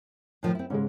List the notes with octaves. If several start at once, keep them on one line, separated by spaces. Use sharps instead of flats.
A2 D#3 F3
C4 E4
G#2 C#3 G#3 C#4